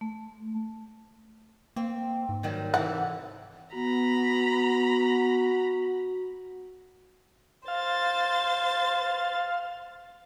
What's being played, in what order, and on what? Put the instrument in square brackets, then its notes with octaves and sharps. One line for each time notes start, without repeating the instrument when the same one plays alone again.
[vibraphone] A3
[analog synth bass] A#3 [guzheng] C4
[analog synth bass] G#2
[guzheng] D#3 F#3 G3
[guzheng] C3 E3 A4 [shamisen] F#5
[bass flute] B3 [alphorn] F#4 [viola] A#5 B5
[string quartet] C5 A6 [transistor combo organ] F5